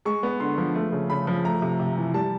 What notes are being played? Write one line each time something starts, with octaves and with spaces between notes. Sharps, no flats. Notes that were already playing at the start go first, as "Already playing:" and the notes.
G#3 C#6
B3
D3 C6
F3
A3
C#3
C#3 B5
F3
A3 A#5
C3
C3
E3
G3 A5